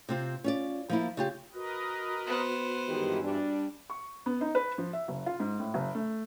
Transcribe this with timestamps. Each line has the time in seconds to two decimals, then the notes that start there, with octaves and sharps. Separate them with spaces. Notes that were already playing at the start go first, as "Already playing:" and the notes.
0.09 C3 C4 F4
0.44 C#4 F4 D5
0.89 F3 A#3 E4
1.17 C#3 F4 G4
1.54 F#4 A#4 B4 D#5
2.26 B3 C5
2.88 G2 D#3 E3 G#3 G4
3.22 G3 D4
3.90 C#6
4.26 B3
4.41 D#4
4.55 B4
4.78 F3
4.93 E5
5.08 F#1
5.26 F4
5.40 G#2
5.59 A2
5.74 F#1
5.95 A3